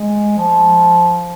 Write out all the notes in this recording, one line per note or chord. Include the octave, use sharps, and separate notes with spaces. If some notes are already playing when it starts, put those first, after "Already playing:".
Already playing: G#3
F3